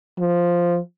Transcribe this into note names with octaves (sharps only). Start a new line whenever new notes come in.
F3